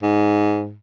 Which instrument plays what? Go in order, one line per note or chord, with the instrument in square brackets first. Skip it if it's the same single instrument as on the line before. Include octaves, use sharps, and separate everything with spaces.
[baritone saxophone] G#2